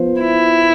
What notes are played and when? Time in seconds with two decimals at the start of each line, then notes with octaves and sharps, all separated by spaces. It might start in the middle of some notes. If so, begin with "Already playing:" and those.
Already playing: F3 B3 F4 C5
0.21 E4